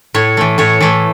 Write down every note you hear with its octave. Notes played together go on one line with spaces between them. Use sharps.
A2 C#5
E3 A3
A2 C#5
E3 A3